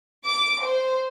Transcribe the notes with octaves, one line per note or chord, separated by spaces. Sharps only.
D6
C5